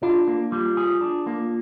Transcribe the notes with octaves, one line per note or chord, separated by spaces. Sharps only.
D4 F4
A#3
G3
G#4
D4
A#3